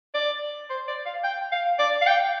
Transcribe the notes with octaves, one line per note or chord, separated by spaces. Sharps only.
D5
C5
D5
F5
G5
F5
D5
F5
G5